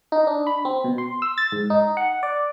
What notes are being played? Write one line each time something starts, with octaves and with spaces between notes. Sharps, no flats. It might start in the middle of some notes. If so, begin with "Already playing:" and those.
D#4
D4
B5
C4
B2
C6
E6
A6
G#2
D#4
F#5
D5